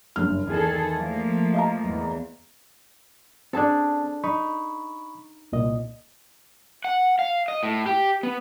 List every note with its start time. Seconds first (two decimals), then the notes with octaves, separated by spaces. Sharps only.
0.16 F#1 G2 F6
0.47 E2 D#3 G#4 A4
0.93 F3 A3 A#3
1.54 D#5 F5 A#5
1.85 E2
3.53 C4 D4 G#4 A4 A5
4.24 D#4 B5 C#6
5.52 C2 A#2 D#5
6.85 F#5
7.19 F5
7.48 D#5
7.63 A2
7.86 G4
8.23 B3